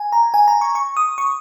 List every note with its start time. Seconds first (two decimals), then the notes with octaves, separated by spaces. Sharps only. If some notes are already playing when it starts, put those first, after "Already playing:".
Already playing: G#5
0.12 A#5
0.34 G#5
0.48 A#5
0.61 C#6
0.75 C#6
0.97 D#6
1.18 C#6